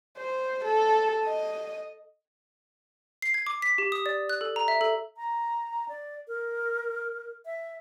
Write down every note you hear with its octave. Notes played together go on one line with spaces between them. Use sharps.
C5
A4
D#5
C7
G#6
D6
B6
G4
D#6
D5
F#6
A4
A#5
E5
A4
A#5
D5
A#4
E5